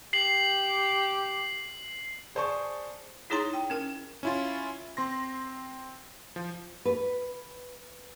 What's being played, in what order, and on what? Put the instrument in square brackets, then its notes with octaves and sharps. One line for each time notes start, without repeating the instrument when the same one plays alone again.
[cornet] G4 [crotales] C7 F#7
[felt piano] G#4 C5 D5 A5 C#6
[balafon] D#4 E4 G#4 C#5 A#5 C6
G5
C#4 A#4
[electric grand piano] C#4 E4 F4
C4 C6 A#6
F3
[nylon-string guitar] B4